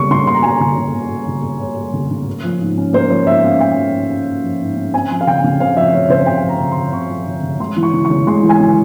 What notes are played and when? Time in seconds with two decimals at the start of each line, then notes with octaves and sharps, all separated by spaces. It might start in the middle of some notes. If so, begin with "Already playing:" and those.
Already playing: C#3 G3 A#3 C#6
0.11 C#3 C6
0.27 A#3 C6
0.35 A#5
0.42 G3 G#5
0.49 A#5
0.61 C#3
0.77 C#3
0.94 A#3
1.11 G3
1.28 C#3
1.43 C#3
1.60 A#3 C#5
1.77 G3
1.94 C#3
2.11 C#3
2.26 A#3
2.44 F3
2.61 G#2
2.78 C#4
2.93 A#3 C5
3.10 F3 C#5
3.27 G#2 E5
3.43 C#4 F5
3.60 A#3 G5
3.76 F3
3.93 G#2
4.11 C#4
4.27 A#3
4.44 F3
4.61 G#2
4.77 C#4
4.94 C4 G#5
5.10 F3
5.21 F5
5.27 C#3 G5
5.44 C#3
5.60 C4 F5
5.77 F3 E5
5.93 C#3 C#5
6.10 C#3 C5
6.26 C4 G5
6.43 F3
6.49 A#5
6.61 C#3
6.72 C#3 C6
6.93 C4 C#6
7.10 F3
7.27 C#3
7.43 C#3
7.60 G#3 C6
7.76 E3
7.83 C#6
7.93 C#3
8.05 C#6
8.10 C#3
8.27 G#3 C6
8.43 E3
8.49 G#5
8.60 C#3